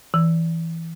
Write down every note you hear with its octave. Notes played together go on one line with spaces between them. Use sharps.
E3